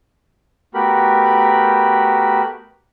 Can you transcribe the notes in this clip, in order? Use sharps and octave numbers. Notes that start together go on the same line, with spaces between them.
A3 B3 F#4 G4 A#4 B5